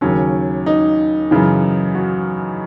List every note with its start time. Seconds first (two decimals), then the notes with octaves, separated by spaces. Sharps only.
0.01 D#2 C#3 F#3 C#4
0.66 D#4
1.31 F#2 C#3 E3
1.95 F#4